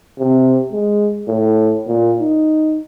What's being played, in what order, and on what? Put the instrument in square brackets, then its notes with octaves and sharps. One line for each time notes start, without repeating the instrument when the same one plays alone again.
[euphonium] C3
G#3
A2
A#2
D#4